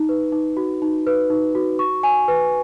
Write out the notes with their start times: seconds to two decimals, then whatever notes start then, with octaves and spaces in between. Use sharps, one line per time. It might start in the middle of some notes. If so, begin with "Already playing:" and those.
Already playing: D#4
0.09 B4
0.32 D#4
0.57 F#4
0.82 D#4
1.07 B4
1.30 D#4
1.55 F#4
1.79 C#6
2.03 G#5
2.28 B4